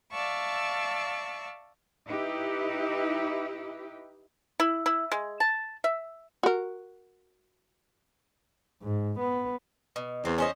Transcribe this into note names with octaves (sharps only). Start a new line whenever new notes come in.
D5 E5 F5 A5 C#6 E6
D#4 E4 G4 B4
E4
E4
G#3
A5
E5
F#4 A#4
G#2
B3
B2
E2 C4
C#4 C5 D#5